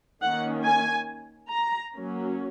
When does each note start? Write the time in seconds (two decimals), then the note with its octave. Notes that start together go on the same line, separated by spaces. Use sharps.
0.21 D#3 A#3 C#4 F#5
0.64 G#5
1.50 A#5
1.94 F#3 A#3 C#4